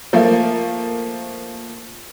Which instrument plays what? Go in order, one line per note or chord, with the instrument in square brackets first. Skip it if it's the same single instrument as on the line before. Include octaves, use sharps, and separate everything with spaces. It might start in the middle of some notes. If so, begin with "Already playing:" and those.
[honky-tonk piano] F3 A3 A#3